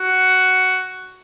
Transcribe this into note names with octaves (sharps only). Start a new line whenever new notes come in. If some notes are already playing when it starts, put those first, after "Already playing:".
Already playing: F#4